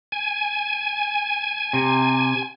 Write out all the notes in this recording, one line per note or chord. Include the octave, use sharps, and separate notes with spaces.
G#5
C3